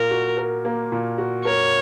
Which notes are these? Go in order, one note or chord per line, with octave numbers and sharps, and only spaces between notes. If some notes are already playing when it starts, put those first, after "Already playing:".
Already playing: A#2 A#4
F#4
A#4
A#3
A#2
F#4
A#4 C#5